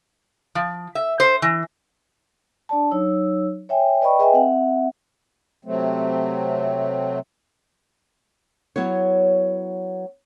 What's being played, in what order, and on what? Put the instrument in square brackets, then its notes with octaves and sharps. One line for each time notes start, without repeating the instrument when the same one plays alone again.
[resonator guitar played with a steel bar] F3
E5
C5
E3
[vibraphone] D4 D5 A5
F#3 D#4 C#5 E6
C#5 E5 G5 G#5
B4 D5 D#5 G5 B5 C#6
G#4 B4 D#5 E5 G5 G#5
C4 E5 F#5
[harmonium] C3 F#3 A3 C4
[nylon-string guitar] F#3 B3 E4 C#5